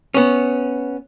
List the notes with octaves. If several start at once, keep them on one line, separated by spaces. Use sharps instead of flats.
B3 C#4